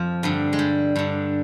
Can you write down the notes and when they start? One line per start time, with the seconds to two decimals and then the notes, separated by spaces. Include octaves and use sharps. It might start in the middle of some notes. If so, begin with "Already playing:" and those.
Already playing: F2 F3 F4
0.23 G2 D3
0.53 G#3
0.59 G3
0.96 G2 D3